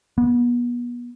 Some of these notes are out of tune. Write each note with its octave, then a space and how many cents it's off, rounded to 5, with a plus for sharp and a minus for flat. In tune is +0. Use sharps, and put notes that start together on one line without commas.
B3 -35